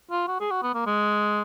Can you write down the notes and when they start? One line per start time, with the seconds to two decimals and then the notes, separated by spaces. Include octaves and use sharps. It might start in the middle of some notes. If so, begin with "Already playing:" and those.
0.11 F4
0.28 F#4
0.40 G#4
0.51 F#4
0.63 B3
0.75 A#3
0.86 G#3